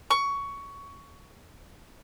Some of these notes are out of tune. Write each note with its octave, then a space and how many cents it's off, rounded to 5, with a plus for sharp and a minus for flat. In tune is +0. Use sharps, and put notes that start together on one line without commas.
C#6 +15